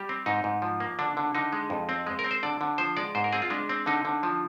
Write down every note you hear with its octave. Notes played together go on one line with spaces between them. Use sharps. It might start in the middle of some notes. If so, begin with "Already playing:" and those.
Already playing: G3 G4
C4
G#2 D#4
G#2
F3
A#3
D3 D4
D3
D3 D#4
G#3
F2
C4
G#3
A#4
C4
C5
D3 D5
D3
F3 C5
G#3 D5
G#2 C5
A#4
C4 G#4
F4
G#3 D4
C4
D3 D#4
D3
F3